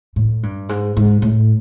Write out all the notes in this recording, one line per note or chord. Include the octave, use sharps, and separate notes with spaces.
A2
G2
G#2
G#2
A2